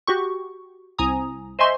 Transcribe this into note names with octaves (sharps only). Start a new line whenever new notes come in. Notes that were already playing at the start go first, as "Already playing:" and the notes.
F#4 G4 C#6
C2 G#5 A#5 D#6
C5 D#5 E5 G#5 C6 C#6